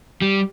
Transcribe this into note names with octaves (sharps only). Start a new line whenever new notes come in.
G3